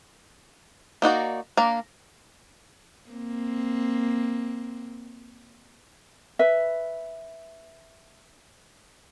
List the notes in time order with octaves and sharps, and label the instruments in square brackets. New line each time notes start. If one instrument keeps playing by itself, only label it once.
[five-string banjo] A#3 D#4 F#4 D5
A#3 D4 A#4
[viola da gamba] A#3 C4
[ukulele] B4 E5